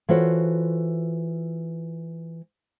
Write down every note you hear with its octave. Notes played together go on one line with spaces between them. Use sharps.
E3 F4 F#4 A4 C5 C#5